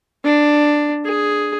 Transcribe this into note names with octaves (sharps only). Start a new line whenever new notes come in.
D4
G#4